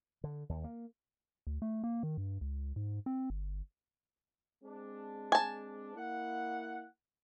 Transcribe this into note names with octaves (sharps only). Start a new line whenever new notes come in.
D3
D#2
A#3
D2
A3
A#3
D#3
G2
C#2
G#2
C4
G1
G#3 C4 D4
G#5 A5
A#3 E4 F#5